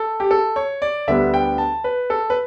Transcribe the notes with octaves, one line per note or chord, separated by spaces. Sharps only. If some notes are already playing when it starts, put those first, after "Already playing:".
Already playing: A4
G4
A4
C#5
D5
D2 D3 G3 B3 D4 E5
G5
A5
B4
A4
B4